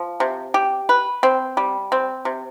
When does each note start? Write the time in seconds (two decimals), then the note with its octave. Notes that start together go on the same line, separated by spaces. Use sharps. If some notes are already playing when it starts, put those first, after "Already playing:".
Already playing: F3
0.20 C3
0.54 G4
0.89 B4
1.23 C4
1.57 G3
1.92 C4
2.25 C3